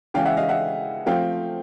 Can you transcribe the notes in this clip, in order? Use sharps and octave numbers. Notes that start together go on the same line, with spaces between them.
C#3 E3 G#3 C#4 F5 G5
E5 F#5
D#5 F5
E5 F#5
F3 A3 C4 F5 G5